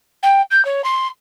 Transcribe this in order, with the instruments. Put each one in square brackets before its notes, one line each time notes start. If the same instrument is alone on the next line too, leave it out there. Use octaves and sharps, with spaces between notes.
[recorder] G5
G6
C#5
C6